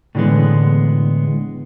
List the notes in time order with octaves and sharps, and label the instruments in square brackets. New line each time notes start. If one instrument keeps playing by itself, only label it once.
[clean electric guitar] A2 D3 E3 G#3 B3